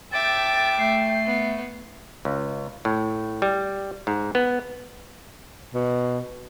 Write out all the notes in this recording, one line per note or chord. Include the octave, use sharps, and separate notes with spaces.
A2 E5 G5 D6 A6
A3 C7
B3
C#2
A2
G3
G#2
B3
B2